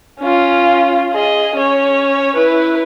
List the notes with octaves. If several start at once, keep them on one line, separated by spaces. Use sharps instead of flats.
C#4 F4
G#4 D#5
C#4 C#5
E4 B4